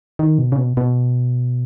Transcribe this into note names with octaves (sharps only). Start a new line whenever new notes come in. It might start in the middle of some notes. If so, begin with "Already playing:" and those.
D#3
B2
C#3
B2
B2